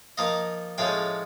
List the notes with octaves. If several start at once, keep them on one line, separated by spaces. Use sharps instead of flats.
F3 A#3 D#4 D#5 F5
A2 F3 G#3 C#4 F5 G5